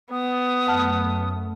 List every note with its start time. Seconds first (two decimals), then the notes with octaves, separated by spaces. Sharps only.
0.12 B3 D#6
0.67 F#2 A3 F#5 A5 F6